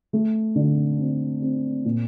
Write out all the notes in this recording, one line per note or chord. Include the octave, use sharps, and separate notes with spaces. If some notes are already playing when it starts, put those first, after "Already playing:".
A3
D3
C4
C4
A#2